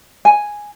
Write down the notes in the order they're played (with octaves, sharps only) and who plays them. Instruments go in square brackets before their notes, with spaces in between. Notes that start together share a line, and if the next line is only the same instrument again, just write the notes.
[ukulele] G#5